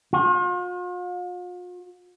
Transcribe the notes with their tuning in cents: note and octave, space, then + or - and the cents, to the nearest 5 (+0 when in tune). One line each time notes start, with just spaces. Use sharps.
F4 +45